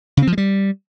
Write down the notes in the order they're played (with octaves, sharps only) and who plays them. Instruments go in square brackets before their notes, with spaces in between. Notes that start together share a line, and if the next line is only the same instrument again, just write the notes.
[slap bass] C#3
C4
F3
G#3
G3